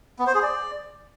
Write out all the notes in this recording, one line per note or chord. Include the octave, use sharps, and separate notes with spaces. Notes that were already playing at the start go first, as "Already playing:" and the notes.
B3
C5
G#4
D5